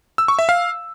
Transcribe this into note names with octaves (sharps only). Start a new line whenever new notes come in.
E6
C#6
E5
F5